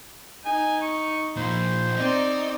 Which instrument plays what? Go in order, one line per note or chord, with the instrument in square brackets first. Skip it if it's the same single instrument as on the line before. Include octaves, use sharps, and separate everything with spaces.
[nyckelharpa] D#4 [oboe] G#5
[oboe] C#6
[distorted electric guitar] A#2 F3 [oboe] C5
[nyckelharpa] C4 D5 [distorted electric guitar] D#4